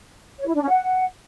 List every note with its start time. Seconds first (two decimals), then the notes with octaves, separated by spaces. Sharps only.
0.39 C#5
0.46 E4
0.54 D4
0.61 C#4
0.69 F#5